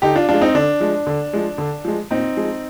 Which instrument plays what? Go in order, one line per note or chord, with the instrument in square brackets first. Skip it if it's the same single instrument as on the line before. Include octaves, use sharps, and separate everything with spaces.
[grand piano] D3 D#4 G4
D4 F4
F3 G#3 D4 F4
C4 D#4
D3 D4
F3 G#3
D3
F3 G#3
D3
F3 G#3
A#2 C4 D#4
F3 G#3